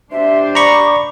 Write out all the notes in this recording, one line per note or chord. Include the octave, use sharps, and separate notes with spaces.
D4 G4 C5 E5
D5 A#5 B5 C#6 D6